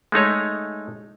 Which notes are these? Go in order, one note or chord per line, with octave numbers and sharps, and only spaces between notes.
G#3 A3 D#4 C#5